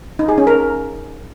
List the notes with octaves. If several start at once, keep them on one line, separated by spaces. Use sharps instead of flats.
D#4
G#4
C#4
A#4